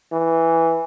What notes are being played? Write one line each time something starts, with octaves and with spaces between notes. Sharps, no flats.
E3